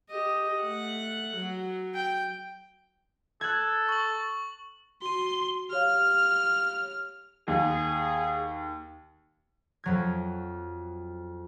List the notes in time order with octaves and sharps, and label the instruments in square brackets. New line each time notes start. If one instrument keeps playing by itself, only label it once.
[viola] G4 D#5
A3 F#5
F#3
G5
[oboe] A4 [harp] F#6 G#6
[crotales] C#6 F#7
[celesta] F#4 D#7 [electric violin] C6
[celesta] G4 C#5 F5 [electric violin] F6
[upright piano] D#2 [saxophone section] G#4
[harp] F2 F#3 G#6